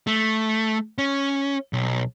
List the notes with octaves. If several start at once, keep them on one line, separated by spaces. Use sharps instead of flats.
A3
C#4
B1